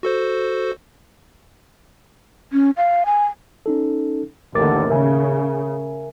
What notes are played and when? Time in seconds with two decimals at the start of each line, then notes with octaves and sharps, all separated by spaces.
0.03 F#4 A4 C5
2.53 C#4
2.77 F5
3.06 G#5
3.66 C#4 D#4 A4
4.55 A1 D#2 D3 A#4 D6 A6
4.90 C#3 A#4 E5 G#5